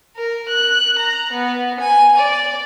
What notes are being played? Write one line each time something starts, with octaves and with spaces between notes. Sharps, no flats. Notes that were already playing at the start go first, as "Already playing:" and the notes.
A#4
F#6
A#5
B3
G#5
D5